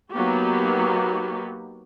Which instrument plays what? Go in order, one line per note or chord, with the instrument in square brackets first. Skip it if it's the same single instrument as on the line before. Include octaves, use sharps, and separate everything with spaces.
[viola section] F#3 A#3 B3 D#4 F#4 G4